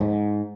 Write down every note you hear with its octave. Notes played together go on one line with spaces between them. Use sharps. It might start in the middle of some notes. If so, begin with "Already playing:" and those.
G#2